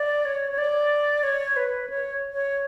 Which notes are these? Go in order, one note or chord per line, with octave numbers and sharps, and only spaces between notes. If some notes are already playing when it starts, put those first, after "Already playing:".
Already playing: D5
C#5
C#5
D5
C#5
B4
C#5
C#5